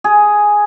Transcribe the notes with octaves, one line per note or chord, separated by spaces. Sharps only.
G#4